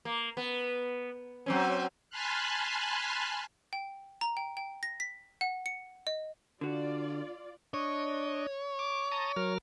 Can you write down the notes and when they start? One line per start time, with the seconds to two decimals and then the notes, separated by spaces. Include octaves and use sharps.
0.05 A#3
0.37 B3
1.46 F#3 C4 C#4
2.10 G#5 A5 B5 C6 F6 F#6
3.73 G5
4.21 A#5
4.37 G5
4.57 G5
4.83 A#6
5.00 B6
5.41 F#5
5.66 C#7
6.07 D#5
6.61 D3 F4 F#4 D5
7.74 D4 C#5 D#5
8.79 D6
9.12 A5 A#5 D#6
9.36 F#3 A#4 F6